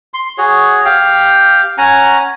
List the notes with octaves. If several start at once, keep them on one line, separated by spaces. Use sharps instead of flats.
C6
F#4 G#4 C#5
G4 F5 G5
C#4 F#5 G#5 A#5